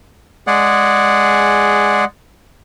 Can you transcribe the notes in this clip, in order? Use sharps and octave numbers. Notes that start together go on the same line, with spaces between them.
G#3 G#4 D5 F#5